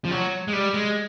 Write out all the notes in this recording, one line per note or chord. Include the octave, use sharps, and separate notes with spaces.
F3
F#3
G#3
G3
G#3